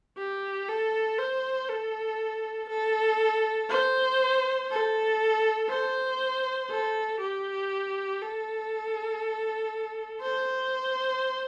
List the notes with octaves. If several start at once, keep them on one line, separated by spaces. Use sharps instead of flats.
G4
A4
C5
A4
A4
C5
A4
C5
A4
G4
A4
C5